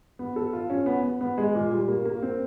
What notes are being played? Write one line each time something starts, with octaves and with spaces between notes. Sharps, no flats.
B3
A4
F4
C#4
B3
B3
B3
G#3
A#2
G3
A#3
A#3
C4